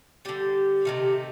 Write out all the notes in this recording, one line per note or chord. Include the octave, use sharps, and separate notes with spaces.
D3 G3 G4
C3 D#3 A3